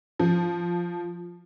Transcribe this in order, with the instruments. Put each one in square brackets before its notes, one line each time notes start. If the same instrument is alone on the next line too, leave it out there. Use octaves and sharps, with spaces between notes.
[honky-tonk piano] F3